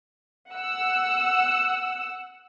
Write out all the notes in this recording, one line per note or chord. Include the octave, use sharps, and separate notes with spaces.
F#5 E6